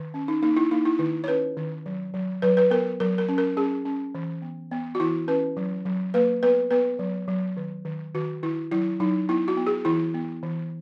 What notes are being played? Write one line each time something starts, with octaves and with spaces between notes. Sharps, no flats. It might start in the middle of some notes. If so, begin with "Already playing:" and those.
Already playing: D#3
C#4
D#4
A#3 D#4
E4
A#3 D#4
E4
D#3 E4
C#5
C#4 B4
D#3
F#3
F#3
F#3 B4
B4
B3 A#4
F#3 A#4
A#4
C#4
A#4
C#4 G#4
C#4
E3
B3
B3
F#4
E3 E4
C#4 B4
F#3
F#3
A#3 B4
B3 B4
B3 B4
F#3
F#3
D#3
D#3
D#3 F#4
D#3 E4
F#3 E4
F#3 D#4
B3 E4
F#4
B3
G#4
E3 E4
B3
E3